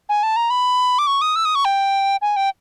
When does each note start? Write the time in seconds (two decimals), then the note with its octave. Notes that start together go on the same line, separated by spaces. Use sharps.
0.09 G#5
0.23 A5
0.36 A#5
0.50 B5
0.98 D6
1.07 C#6
1.21 D#6
1.36 E6
1.45 D#6
1.55 C#6
1.65 G5
2.22 G#5
2.36 G5